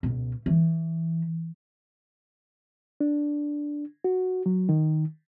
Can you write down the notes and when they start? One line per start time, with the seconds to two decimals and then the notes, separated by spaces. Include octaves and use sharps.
0.03 C#2 B2
0.46 E3
3.00 D4
4.04 F#4
4.46 F#3
4.69 D#3